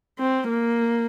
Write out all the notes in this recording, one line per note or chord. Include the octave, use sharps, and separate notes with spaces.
C4
A#3